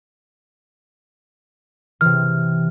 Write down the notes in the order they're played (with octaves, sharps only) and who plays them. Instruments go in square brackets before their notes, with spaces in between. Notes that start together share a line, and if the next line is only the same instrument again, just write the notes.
[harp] C3 E3 [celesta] F6